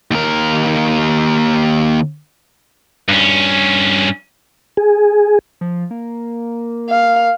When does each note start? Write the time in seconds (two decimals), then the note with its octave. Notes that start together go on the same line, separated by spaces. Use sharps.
0.11 D#2 A#4
3.09 G2 C#4
4.77 G#4
5.61 F3
5.91 A#3
6.90 F5